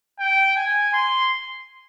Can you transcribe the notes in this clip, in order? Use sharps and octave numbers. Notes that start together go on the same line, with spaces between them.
G5
G#5
C6